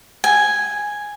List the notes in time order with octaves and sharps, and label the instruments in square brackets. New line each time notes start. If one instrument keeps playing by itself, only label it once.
[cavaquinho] G#5